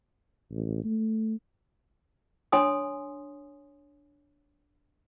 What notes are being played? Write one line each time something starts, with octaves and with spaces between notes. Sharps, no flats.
A1
A3
D4 C#5 G#5 C6 D#6